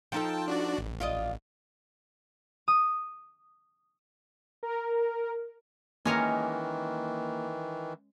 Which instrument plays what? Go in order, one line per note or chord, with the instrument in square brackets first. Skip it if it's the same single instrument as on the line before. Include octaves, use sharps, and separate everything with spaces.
[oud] F3 D#4 A4 [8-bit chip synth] G5 A5
[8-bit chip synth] D4 F#4 D5
A1
[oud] F4 D5 D#5
[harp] D#6
[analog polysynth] A#4
[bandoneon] D#3 E3 [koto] G#3 C#4 A#4 [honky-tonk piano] A#3